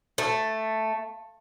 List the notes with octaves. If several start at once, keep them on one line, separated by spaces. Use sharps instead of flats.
A3